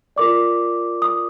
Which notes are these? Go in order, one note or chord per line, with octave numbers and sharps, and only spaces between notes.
F4 A#4 D5 D6
D#6